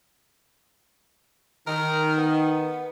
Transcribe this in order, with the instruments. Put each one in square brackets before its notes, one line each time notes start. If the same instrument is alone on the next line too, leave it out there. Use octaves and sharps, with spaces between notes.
[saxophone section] D#3 [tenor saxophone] A#4
[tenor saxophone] B3